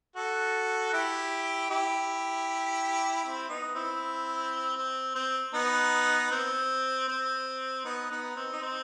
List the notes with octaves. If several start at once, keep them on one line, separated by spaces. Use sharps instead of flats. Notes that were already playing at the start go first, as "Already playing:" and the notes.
F#4 A4
E4 G4
E4 G4
C4 E4
B3 D#4
C4 E4
C4
C4
B3 D#4
C4
C4
B3 D#4
B3 D#4
C4
D#4
C4